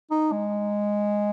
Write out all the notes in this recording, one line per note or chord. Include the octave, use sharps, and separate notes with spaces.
D#4
G#3